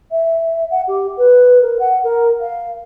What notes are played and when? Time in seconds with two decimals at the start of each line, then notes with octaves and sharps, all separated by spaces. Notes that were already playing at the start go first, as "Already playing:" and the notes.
0.11 E5
0.70 F#5
0.87 G4
1.18 B4
1.61 A#4
1.79 F#5
2.03 A#4
2.40 F5